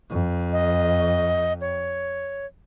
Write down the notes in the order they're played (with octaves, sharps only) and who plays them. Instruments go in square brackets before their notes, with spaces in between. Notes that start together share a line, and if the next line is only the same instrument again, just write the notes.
[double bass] F2
[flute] D#5
C#5